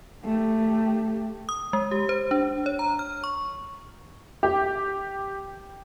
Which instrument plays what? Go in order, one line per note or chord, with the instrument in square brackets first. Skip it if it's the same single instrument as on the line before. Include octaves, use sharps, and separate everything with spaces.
[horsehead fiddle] A3 G4
[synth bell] D#6
G#3
G4
C5
D4
C#5
A#5
F6
C#6
[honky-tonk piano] G4